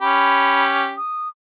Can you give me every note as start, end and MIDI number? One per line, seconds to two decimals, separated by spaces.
0.01 0.95 61
0.01 0.95 67
0.01 0.63 83
0.97 1.29 87